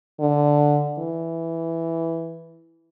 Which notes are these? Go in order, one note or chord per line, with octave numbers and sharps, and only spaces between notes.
D3
E3